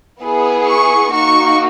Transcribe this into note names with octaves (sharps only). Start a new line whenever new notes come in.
B3 E4 G#4
C#6
A#3 D#4 F#4 C#6